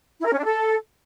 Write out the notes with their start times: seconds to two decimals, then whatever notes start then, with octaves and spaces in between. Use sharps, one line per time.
0.20 E4
0.26 A#4
0.32 C#4
0.38 D4
0.45 A4